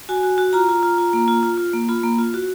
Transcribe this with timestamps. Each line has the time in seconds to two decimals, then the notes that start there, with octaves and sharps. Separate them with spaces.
0.09 F#4 G#5
0.23 F#4
0.38 F#4
0.53 F4 A#5
0.69 F4
0.83 F4
0.98 F4
1.13 A#3
1.28 F4
1.43 F4
1.58 F4
1.74 A#3
1.88 F4 B5
2.04 A#3
2.19 F4
2.34 F#4